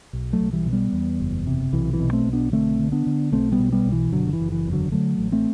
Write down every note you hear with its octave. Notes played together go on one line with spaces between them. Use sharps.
B1
F#3 A3
B1
E3 G3
B2
G3 B3
E2
F#1
C3
B1 E3
E3
B2
A3 C4
B1
B3 D4
D3 A3 C4
D3
B3 D4
D3
B1 A3 C4
G3 B3
B2
G3 B3
B1
E3
F#1 D3 F#3
F#3
E3
F#1
E3
E2
D3 F#3
D3 F#3 A3
A1
A3 C4